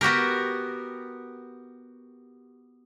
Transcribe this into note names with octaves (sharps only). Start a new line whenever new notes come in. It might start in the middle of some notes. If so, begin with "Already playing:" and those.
B3 F#4 G4 A#4